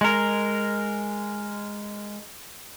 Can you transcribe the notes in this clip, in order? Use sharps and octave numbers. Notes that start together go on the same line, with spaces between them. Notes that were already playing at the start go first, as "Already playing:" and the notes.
G#3 A#4